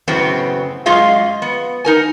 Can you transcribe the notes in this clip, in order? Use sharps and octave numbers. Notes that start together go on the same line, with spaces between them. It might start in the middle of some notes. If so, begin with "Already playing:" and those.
F#2 A2 C#3 F#3 B3 C4
F#2 G#3 F4 G#4 D#5 F5
B3
D#4 A#4 G#5